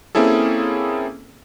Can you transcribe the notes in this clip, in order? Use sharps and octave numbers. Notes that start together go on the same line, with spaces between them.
A#3 C4 C#4 E4 G#4 A4